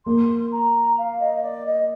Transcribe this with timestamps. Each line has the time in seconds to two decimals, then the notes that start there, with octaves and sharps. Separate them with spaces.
0.05 A#3 C6
0.51 A#5
0.98 F5
1.19 D#5
1.42 D5
1.66 D#5